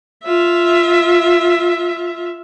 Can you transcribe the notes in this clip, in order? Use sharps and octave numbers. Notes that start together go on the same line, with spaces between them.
F4 E5